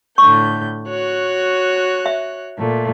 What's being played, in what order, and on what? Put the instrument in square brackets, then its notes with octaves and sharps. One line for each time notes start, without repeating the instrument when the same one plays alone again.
[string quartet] A2 D3 G6 [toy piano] C#6
[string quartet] F#4 C#5 F#6
[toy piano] E5
[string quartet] A#2 A3